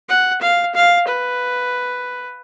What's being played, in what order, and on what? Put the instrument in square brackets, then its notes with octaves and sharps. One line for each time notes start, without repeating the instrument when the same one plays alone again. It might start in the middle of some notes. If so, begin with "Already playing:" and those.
[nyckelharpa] F#5
F5
F5
B4